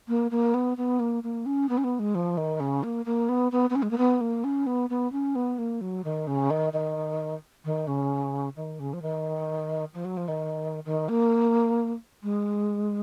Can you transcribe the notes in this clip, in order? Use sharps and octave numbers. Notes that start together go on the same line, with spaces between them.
A#3
A#3
B3
B3
A#3
A#3
C#4
B3
C#4
B3
G#3
F3
D#3
C#3
A#3
A#3
B3
B3
B3
C#4
G#3
A#3
B3
A#3
C#4
B3
B3
C#4
B3
A#3
F#3
D#3
C#3
D#3
D#3
D#3
C#3
D#3
C#3
F3
D#3
F3
F#3
F3
D#3
D#3
A#3
G#3